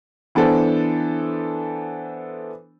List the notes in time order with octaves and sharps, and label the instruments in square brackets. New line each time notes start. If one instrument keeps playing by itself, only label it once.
[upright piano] E3 B3 D4 A4 C5